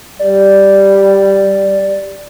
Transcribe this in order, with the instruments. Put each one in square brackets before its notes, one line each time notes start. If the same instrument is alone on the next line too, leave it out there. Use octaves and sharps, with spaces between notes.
[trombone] G3 [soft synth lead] D5